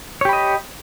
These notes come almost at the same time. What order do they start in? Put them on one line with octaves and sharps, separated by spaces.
C#5 G4 B5 D#5